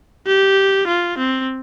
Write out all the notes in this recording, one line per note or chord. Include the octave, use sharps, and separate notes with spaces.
G4
F4
C4